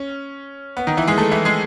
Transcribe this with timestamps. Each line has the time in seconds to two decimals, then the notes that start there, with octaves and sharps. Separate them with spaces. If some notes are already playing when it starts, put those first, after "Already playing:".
Already playing: C#4
0.77 B3
0.87 D#3 D#4
0.97 E3 E4
1.07 G#3 G#4
1.18 A3 A4
1.31 E3 E4
1.45 G#3 G#4